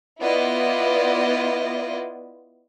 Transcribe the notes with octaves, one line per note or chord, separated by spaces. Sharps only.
B3 E4 F4 D5 D#5